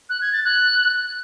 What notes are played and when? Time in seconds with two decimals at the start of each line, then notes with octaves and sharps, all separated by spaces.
0.10 F#6
0.21 G#6
0.33 A6
0.44 F#6